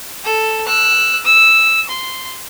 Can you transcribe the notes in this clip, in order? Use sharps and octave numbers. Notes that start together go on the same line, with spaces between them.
A4
E6 F#6
E6
C6